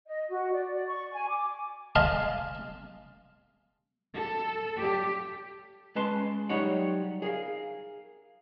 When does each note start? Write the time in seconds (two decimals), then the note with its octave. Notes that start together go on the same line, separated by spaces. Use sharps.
0.07 D#5
0.30 F#4
0.53 D5
0.74 D5
0.87 C#6
1.12 G#5
1.28 D6
1.95 D#5 F5 G#5 A5 C6
4.14 A4
4.79 G4
5.95 G#3 C#4 B4 A5 C6
6.49 F#3 G3 D#4 C#5 F#5
7.22 G#4 A#4 F5